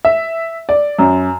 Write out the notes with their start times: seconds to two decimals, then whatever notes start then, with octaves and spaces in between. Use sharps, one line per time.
0.05 E5
0.69 D5
0.99 F#2